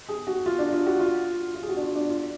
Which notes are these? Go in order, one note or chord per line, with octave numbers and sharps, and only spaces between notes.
G#4
F#4
F4
D4
F4
F#4
F4
F4
G#4
F#4
D4
F4
D4
F4